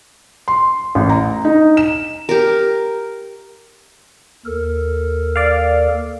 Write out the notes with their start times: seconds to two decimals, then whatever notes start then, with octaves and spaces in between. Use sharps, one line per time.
0.48 C6
0.95 A1
1.09 A#5
1.45 D#4
1.77 E7
2.29 G4 A#4
4.46 D#2 A4 A#4
5.36 D5 F5